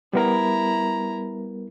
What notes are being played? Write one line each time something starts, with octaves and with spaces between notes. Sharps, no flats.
G3 B3 E4 A#4 A#5